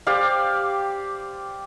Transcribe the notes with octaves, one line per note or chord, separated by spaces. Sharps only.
G4 C5 D5 F5